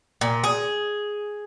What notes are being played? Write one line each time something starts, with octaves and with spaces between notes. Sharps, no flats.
A#2
G#4